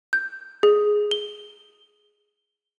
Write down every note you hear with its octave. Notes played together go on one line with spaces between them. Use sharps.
G6
G#4
G7